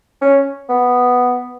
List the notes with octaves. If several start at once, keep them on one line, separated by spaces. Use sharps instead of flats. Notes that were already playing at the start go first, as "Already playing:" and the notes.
C#4
B3